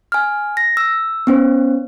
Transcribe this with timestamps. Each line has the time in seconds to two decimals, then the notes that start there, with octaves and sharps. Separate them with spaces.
0.12 G#5 F6
0.57 A#6
0.77 E6
1.27 B3 C#4 C5